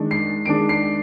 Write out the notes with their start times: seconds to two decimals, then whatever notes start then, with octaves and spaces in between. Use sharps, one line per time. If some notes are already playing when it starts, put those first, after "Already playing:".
Already playing: D#3 G#3 D4
0.11 C7
0.46 D#3 G#3 D4 D7
0.69 C7